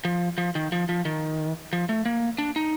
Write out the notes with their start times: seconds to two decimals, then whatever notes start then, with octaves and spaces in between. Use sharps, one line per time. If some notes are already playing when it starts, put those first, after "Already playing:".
0.05 F3
0.38 F3
0.55 D#3
0.72 F3
0.89 F3
1.05 D#3
1.73 F3
1.89 A3
2.05 A#3
2.38 D4
2.56 D#4